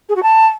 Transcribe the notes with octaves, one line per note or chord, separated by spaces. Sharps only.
G#4
F#4
A5